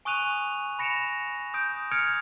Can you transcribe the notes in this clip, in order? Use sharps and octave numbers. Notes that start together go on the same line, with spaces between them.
G#5 C#6 D#6 F#6 D#7 F7
B5 A#6 C#7 D7 E7 F7
D#6 G6 D7
D#6 F6 G#6 C#7 D7 F7